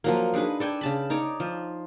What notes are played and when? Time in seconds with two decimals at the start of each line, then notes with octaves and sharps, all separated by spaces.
0.04 F3 F#3 A#3
0.34 D4 D#4 G#4 B4
0.60 A4 D5 G5 G#5
0.81 C#3 A5 B5
1.10 D#4 C#5 D5
1.40 F3